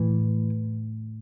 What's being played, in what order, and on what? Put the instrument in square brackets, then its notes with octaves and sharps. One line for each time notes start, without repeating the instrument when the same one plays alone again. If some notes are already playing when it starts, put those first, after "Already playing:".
Already playing: [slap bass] A2 E3